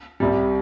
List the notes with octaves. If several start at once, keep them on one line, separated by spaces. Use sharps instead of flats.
C2 C3 G3